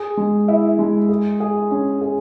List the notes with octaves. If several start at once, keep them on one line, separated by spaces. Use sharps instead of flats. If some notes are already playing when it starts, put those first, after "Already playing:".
Already playing: G#4
G#3
E4
G#3
G#4
G#4
C#4
G#4